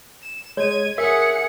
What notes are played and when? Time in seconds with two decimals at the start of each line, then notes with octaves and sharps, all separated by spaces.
0.23 E7
0.57 G#3 C#5 G#6 D#7
0.98 G#4 A#4 E5 F#5 C#7